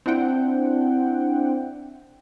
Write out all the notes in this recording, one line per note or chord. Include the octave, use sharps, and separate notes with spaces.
C4 D4 E4 F#5 G5